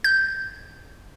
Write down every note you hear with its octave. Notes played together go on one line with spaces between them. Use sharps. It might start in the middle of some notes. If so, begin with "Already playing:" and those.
G6